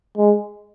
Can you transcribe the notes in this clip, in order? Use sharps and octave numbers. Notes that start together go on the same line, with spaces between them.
G#3